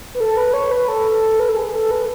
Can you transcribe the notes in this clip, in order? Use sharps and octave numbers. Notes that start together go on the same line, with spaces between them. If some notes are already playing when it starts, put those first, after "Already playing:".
B4
A4
B4
C#5
B4
A4
B4
A4
G#4
A4
B4